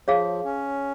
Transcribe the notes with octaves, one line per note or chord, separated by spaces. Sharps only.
F3 G#4 C#5 F5
C#4